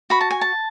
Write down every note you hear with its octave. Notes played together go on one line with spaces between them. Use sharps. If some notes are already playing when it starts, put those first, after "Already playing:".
F#4 B5
A5
G#5
A5